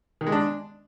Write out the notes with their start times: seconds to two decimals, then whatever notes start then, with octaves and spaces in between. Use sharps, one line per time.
0.21 D#3
0.27 G#3
0.32 D4